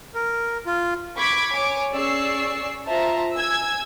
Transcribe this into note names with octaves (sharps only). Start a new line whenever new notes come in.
A#4
F4
B5 C#6 D6 G#6 B6
C#5 G#5 D6
C#4 G#4 D5 C#6 E6 C7
F4 C5 E5 A5 A#5
G#5 E6 G#6